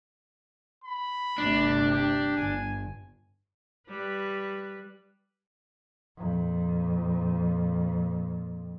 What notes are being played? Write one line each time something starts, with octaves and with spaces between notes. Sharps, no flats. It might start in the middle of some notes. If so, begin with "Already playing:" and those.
B5
G1 D2 C3 D4
G4
G1 G#5
G3 B4
F2 A#2